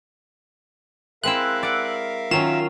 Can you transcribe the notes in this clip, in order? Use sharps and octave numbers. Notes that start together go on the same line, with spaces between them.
G#3 C4 E4 A#4 E5 F5 E6 F#6
D5 F#5
D#3 F#3 C#4 F4 E7